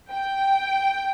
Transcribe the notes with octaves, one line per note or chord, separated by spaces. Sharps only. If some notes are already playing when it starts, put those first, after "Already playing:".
G5